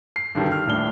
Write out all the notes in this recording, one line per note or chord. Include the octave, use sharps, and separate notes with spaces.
C7
G2 B2 D3 D#3 G3
F6
D#1 A2 D4 G7